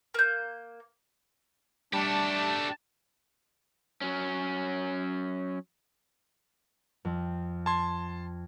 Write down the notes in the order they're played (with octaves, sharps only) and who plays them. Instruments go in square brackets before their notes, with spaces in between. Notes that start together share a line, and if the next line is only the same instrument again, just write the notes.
[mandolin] A#3 G6
[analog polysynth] G3 [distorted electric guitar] A3 G4 [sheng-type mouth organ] D4 [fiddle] A5
[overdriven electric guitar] F#3 C#4
[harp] F2
[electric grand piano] A5 C6 [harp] G#6